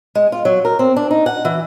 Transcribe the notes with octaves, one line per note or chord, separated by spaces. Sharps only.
G#3
F4
F#3
A#4
C4
D4
D#4
F#5
E3